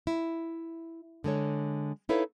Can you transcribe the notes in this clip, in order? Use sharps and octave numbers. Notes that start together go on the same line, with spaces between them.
E4
D3 G#3 A4 C#5
D#4 E4 A4 B4 C#5 F5